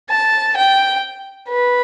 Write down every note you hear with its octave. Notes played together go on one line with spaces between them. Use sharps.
A5
G5
B4